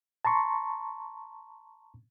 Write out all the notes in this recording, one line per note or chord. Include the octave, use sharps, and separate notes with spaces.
A5 A#5 C6 C#6